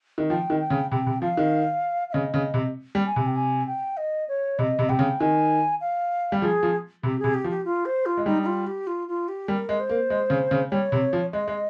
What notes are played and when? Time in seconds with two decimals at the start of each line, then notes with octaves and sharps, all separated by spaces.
0.18 D#3
0.29 F3 G5
0.50 D#3
0.60 G5
0.70 C#3
0.91 C3 G5
1.06 C3
1.21 F3 F5
1.37 D#3
2.10 F5
2.13 C#3 D#5
2.34 C#3
2.54 C3
2.95 G3
3.06 G#5
3.16 C3
3.26 G5
3.36 G#5
3.67 G5
3.97 D#5
4.28 C#5
4.59 C3 D#5
4.79 C3
4.89 C3 G5
4.99 C#3
5.20 D#3 G#5
5.81 F5
6.32 G3
6.42 F3 G#4
6.63 F3
7.03 C3 G4
7.19 C3 G#4
7.34 G4
7.44 F3
7.50 G4
7.65 F4
7.86 C5
8.06 F4
8.17 G#3
8.26 G3 D#4
8.43 D#4
8.46 F4
8.67 G4
8.87 F4
9.08 F4
9.28 G4
9.48 G3 A#4
9.69 G#3
9.80 C5
9.89 A#3
10.10 G#3
10.30 C#3
10.51 C#3
10.71 G3 C#5
10.92 C3
11.13 F3
11.33 G#3 D#5
11.48 G#3